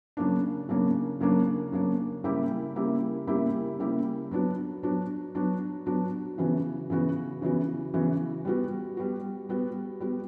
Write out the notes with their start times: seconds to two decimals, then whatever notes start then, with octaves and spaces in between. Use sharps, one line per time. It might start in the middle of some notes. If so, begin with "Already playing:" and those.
0.17 C#3 F#3 A#3 D4
0.69 C#3 F#3 A#3 D4
1.20 C#3 F#3 A#3 D4
1.72 C#3 F#3 A#3 D4
2.24 C#3 G3 A#3 E4 G4
2.76 C#3 G3 A#3 E4 G4
3.27 C#3 G3 A#3 E4 G4
3.79 C#3 G3 A#3 E4 G4
4.31 F#3 B3 D4 F#4
4.83 F#3 B3 D4 F#4
5.35 F#3 B3 D4 F#4
5.86 F#3 B3 D4 F#4
6.38 C#3 E3 B3 F#4
6.90 C#3 E3 B3 F#4
7.42 C#3 E3 B3 F#4
7.94 C#3 E3 B3 F#4
8.45 G3 B3 F#4
8.97 G3 B3 F#4
9.49 G3 B3 F#4
10.00 G3 B3 F#4